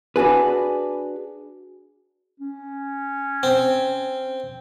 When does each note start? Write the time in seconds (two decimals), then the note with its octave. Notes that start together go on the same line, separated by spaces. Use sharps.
0.16 D4 F#4 G#4 B4
2.40 C#4
3.43 C4